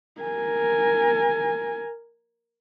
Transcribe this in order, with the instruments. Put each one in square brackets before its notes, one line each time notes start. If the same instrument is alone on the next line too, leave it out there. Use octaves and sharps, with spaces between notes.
[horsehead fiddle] A#4 G#5